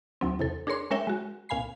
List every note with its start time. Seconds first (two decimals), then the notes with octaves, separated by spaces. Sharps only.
0.21 D2 F#3 C4
0.39 E2 C3 A4
0.67 D4 G#4 A#4 C#5 C6
0.91 G#3 C#4 A#4 C#5 E5 G5
1.07 G#3 F#4
1.49 C2 A#2 F5 G#5 B5 C7